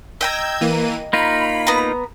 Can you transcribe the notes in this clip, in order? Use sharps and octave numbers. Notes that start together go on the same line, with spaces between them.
D#5 G5 A#5 E6 G6 G#6
E3 A#3 D#7
A#3 D#4 F4 B5
B3 A#5